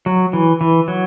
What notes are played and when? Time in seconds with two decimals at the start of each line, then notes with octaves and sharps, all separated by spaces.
0.06 F#3
0.33 E3
0.61 E3
0.88 F#3